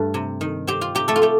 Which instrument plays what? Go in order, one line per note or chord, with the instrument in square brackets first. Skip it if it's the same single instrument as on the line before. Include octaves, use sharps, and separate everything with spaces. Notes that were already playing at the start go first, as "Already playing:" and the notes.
Already playing: [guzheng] G2 A3 A4
C3
D#3
C4 G4
F4
C3 G4
A3 A4
F4
A3 G4